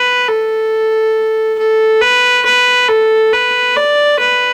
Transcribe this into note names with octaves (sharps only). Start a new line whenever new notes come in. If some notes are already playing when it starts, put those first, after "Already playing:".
Already playing: B4
A4
A4
B4
B4
A4
B4
D5
B4